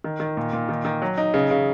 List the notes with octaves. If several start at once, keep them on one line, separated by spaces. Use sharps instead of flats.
D#3
D#3
A#2
A#2
D#3
D#3
F#3
D#4
C#3
C#3